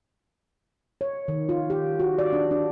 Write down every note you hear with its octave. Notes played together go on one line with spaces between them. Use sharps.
C#5
D#3
F4
G4
F#4
D5
D4
D4